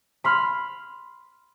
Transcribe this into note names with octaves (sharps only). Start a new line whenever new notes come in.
B5 C6 F6